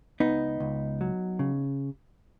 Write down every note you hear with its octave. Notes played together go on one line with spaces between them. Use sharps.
C#2 B3 D#4
C#2
F#3
C#3